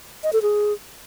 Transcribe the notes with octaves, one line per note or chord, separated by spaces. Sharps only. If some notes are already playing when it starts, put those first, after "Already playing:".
D#5
A4
G#4